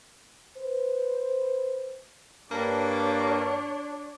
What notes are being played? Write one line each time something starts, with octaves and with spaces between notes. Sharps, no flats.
B4 C5
G2 A#3 D4 C#5 D5